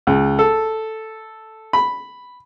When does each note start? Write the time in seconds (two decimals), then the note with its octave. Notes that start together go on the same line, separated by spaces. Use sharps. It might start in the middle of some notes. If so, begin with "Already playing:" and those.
0.07 C#2
0.39 A4
1.73 B5